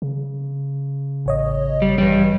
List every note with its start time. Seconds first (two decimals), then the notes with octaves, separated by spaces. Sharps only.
0.02 C#3
1.26 A1 C#5 D#5
1.82 G3
1.98 G2 E3 G3